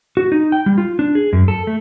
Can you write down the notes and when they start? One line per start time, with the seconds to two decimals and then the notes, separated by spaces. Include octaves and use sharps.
0.17 F#4
0.32 D#4
0.52 G5
0.66 G3
0.78 F4
0.99 D4
1.15 G#4
1.33 F#2
1.48 A4
1.67 A3